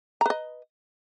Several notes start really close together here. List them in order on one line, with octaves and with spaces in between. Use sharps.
A#5 B4 D#5